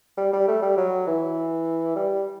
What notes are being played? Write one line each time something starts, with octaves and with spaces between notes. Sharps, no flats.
G3
G3
A3
G3
F#3
E3
G3